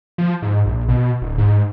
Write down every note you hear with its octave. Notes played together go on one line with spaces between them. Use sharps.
F3
G#2
A#1
B2
D1
G#2